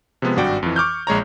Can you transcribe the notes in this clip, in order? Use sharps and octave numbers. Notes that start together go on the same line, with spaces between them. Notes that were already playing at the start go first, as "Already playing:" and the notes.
C3 F3 G#3 B3
G#1 G2 F#4 D5 G5
F2 E3
C#6 D6 F6 G6
A#1 G#3 C#5 A#5